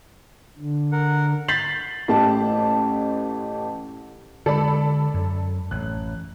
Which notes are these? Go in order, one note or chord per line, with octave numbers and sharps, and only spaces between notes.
D3
A#4 F#5
G6 A6 B6 C7 F#7
A1 A3 G4 A5
D3 G#3 A4 D5 B5
F#2
A1 F#6